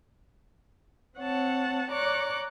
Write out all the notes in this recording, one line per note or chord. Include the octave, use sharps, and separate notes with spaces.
C4 C#5 F#5 A5
C#5 D5 A#5 D6 F#6